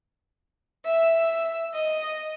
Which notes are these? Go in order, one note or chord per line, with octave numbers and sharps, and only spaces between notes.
E5
D#5